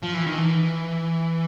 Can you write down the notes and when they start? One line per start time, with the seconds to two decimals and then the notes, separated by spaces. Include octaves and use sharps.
0.03 F3
0.14 E3
0.26 D#3
0.38 E3